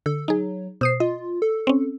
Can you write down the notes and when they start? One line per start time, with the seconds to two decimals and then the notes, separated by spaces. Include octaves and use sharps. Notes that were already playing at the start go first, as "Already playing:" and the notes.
0.06 D3 A4
0.28 F#3 D#4 G#4
0.81 B2 C5 D#6 C7
1.00 F4 D#5
1.42 A4
1.67 C4 C#4